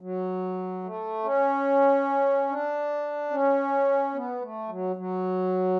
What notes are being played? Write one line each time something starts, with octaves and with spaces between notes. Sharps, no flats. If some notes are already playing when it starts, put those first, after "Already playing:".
F#3
A3
C#4
D4
C#4
B3
A3
F#3
F#3